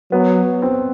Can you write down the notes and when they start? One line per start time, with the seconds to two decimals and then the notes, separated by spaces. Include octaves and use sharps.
0.11 F#3 B3
0.62 C4